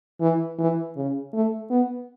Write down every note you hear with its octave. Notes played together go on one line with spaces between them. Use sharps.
E3
E3
C#3
A3
B3